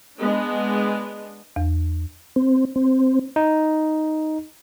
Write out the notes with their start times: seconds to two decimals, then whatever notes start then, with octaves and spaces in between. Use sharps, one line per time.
0.20 G#3 B3 D4
1.56 E2
2.36 C4
2.76 C4
3.36 D#4